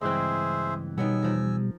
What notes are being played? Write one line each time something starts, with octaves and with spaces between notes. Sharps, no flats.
C#2 G2 E3 G#3 C4 G#4 C5 E5
B2 D#3 F#3 G3 B3 G#5 E6
E2 F3 A#4